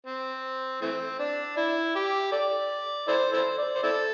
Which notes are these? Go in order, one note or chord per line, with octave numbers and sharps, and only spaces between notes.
C4
E3 A3 C4
D4
E4
G4
A4 D5
E4 A4 C5
E4 A4 C5
D5
C5
C4 E4 A4